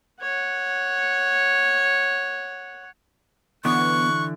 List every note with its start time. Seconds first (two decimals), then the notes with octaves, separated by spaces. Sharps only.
0.22 C#5 F#5
3.65 D3 E3 B3 C#6 F#6